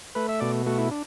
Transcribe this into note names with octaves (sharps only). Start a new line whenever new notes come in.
A3 B4
E5
B2 D5
A3 F#4
E4
D4